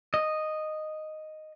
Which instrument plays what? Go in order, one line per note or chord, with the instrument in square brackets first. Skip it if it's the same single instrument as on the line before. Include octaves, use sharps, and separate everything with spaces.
[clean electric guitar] D#5